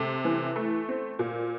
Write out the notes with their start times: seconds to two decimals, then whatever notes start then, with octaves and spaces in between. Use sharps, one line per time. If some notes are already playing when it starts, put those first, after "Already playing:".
Already playing: C3 A4
0.25 E3
0.56 A3
0.89 C4
1.19 A#2